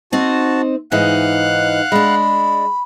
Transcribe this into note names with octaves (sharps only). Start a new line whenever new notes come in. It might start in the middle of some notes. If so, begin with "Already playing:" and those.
C4 D#4 F#4 A5
G#2 E3 D#4 F5 F#5 F#6
G#3 D4 B5